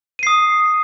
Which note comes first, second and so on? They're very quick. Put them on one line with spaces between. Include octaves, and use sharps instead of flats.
D#7 C7 D#6